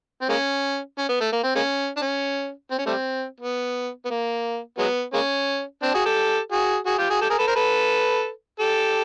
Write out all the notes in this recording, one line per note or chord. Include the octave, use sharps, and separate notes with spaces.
C4
G#3 A#3 C#4
C#4
B3
A3
A#3
C4
G#3 A#3 C#4
D4
C#4
C4
C#4
G3 A3 C4
B3
B3
A#3
F#3 G#3 B3
G#3 A#3 C#4
C4 D4
F#4 G#4
G4 A4
F#4 G#4
F#4 G#4
F4 G4
F#4 G#4
G4 A4
G#4 A#4
A4 B4
A#4 C5
A4 B4
G4 A4